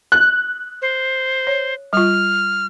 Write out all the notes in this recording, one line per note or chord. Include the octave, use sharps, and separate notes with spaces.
F#6
C5
C#5
G3 F4 F6